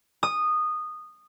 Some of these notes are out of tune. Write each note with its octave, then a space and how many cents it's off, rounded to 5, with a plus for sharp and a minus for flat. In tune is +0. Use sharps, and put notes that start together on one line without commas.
D#6 -15